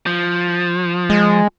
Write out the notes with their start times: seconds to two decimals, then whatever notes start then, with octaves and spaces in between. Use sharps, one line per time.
0.06 F3
1.10 G#3